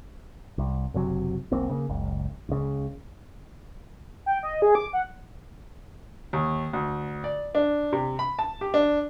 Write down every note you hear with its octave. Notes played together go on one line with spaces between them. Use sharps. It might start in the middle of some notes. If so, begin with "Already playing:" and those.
C2
F#1 C3 F#3
E1 B1 A#3 C4
C#3 A#3
F#1 C#2
C#2 C#3
G5
D#5
G#4
D6
F#5
D#2
D2
D5
D4
C3
B5
A5
G4
D4